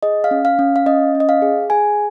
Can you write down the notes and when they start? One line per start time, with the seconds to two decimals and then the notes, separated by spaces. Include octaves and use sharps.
0.03 G#4 D#5
0.24 F5
0.31 C#4
0.45 F5
0.59 C#4
0.76 F5
0.86 C#4 D#5
1.15 C#4
1.20 D#5
1.29 F5
1.42 G#4
1.70 G#4 G#5